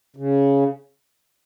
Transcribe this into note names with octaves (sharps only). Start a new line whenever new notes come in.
C#3